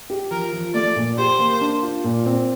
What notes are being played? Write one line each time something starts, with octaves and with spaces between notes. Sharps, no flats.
G4
F3 A#4
F3
A3 D5
A#2
G4 C5
A#3
D4
F4
A#2
C4